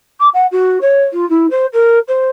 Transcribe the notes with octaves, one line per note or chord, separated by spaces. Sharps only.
D6
F#5
F#4
C#5
F4
E4
C5
A#4
C5